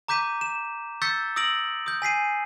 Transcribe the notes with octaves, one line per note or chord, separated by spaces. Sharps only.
A#5 D6 G6 B6 D#7
E7
C#6 E6 G6 A6 B6 C#7
D#6 E6 A#6 D7 F#7
D#6 G6
G#5 B6 C7 D#7